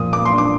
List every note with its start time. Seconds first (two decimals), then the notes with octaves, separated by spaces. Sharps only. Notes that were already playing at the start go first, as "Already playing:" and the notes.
Already playing: A#2 F3 D#6
0.12 A#3 D6
0.25 C6
0.32 D4
0.38 D6